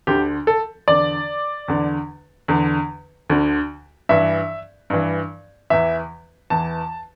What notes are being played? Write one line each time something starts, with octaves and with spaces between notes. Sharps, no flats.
D2 D3 G4
A4
E2 D3 D5
E2 D3
E2 D3
D2 D3
G2 E3 E5
G2 E3
E2 E3 E5
E2 E3 A5